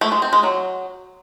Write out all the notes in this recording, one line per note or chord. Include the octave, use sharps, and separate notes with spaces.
A3
G#3
C4
G#3
F#3